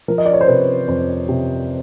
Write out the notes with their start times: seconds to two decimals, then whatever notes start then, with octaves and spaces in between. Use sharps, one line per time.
0.08 F3 A#4
0.18 D#5
0.26 D5
0.33 C#5
0.41 C5
0.48 C3 B4
0.88 F2 C5
1.29 C3